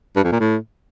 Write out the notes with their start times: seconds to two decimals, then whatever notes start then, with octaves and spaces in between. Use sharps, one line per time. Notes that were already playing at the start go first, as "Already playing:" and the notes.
0.16 G2
0.24 F2
0.32 A#2
0.40 A2